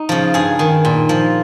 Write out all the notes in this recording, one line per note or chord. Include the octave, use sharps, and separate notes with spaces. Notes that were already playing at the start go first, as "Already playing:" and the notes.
Already playing: D#4
C#3 F3
G2 G#4
D#3
A#2
F3